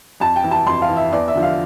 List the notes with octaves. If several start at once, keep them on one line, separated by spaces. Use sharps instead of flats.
F2 A5
G5
E3
A5
F2 C6
F5
E3
E5
E2 D5
E5
D3 F3
F5